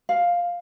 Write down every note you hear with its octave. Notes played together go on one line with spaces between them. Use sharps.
F5